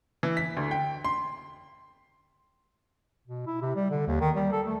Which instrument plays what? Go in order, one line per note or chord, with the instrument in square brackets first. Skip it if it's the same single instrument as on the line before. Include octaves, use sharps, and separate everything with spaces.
[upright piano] E3
B6
D2
G5
C6
[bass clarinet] B2
E4
C3
G3
D3
D#2
D#3
G3
A4
A3